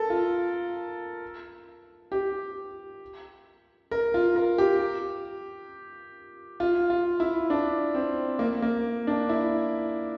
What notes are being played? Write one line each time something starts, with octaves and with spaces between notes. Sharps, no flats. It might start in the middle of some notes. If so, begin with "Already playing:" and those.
Already playing: A4 A#4
F4
G4
A#4
F4
A#4
G4
F4
F4
E4
D4
C4
A#3
A#3
D4
E4